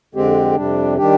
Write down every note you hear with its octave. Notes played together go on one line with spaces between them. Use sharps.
F2 D3 G#3 C4 G4
F2 C3 G3 D4
D#3 G3 D4 G4